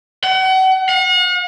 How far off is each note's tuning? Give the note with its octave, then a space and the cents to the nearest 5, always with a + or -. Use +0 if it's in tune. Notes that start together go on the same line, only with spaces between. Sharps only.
F#5 +35
F#5 -45